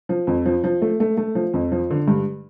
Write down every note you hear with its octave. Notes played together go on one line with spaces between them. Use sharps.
F3
F2
F3
F3
A3
A3
A3
F3
F2
F3
D3
G2